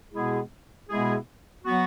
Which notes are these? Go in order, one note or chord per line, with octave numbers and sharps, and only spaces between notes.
B2 G#3 B3 E4 G#4
B2 G#3 B3 E4 G#4
F#3 B3 F#4